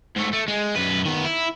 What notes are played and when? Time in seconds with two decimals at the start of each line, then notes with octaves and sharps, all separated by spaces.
0.16 G#2 A3
0.33 A3
0.48 G#3
0.76 F#2 B4
1.05 D#3 B3
1.25 E4